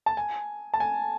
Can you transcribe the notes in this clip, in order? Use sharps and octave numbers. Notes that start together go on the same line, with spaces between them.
A5
G#5
A5
G#5